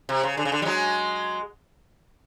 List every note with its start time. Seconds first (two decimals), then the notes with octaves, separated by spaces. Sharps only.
0.09 C3
0.23 C#3
0.37 D3
0.45 C#3
0.52 D3
0.62 G3
0.65 F#3 G#3